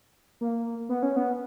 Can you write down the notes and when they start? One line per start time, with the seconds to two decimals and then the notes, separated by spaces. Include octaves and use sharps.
0.41 A#3
0.89 B3
1.03 C#4
1.16 B3